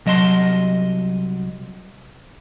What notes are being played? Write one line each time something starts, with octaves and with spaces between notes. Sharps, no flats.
C2 F#3 D#5 A5 C6